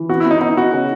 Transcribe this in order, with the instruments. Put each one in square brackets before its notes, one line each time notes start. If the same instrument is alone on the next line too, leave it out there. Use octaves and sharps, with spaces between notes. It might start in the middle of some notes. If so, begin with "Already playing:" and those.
Already playing: [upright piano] E3
[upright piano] B3 [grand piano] F#4
[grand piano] E4
[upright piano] B3
[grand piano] D#4
[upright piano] B3 [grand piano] D#4
[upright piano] B3 [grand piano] F#4
[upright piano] C#3